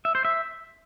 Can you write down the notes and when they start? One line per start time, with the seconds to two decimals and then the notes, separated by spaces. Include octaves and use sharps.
0.05 E5
0.15 C5
0.25 E5